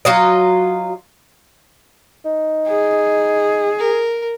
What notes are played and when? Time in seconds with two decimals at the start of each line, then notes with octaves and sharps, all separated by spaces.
0.05 F#3 F4 D#5
2.25 D#4
2.68 G#4
3.78 A#4